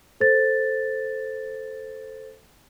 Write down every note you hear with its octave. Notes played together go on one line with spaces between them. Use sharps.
A4 C5 A6